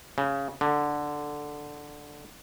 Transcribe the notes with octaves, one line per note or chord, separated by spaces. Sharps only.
C#3
D3